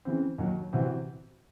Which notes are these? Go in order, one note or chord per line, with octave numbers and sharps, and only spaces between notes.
C#3 E3 C4
D#2 D#3 F#3
C3 E3 C4 F#4